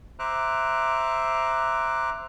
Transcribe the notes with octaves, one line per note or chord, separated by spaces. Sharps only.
C5 E5 A#5 D6 F#6